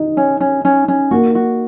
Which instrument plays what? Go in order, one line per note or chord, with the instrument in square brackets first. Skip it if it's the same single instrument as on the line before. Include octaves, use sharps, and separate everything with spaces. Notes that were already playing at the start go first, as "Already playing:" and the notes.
Already playing: [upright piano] D#4
[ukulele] C#4
C#4
C#4
C#4
[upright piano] A#3 [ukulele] F#4
[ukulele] F#4